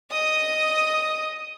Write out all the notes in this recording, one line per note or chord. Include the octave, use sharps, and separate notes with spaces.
D#5 D#6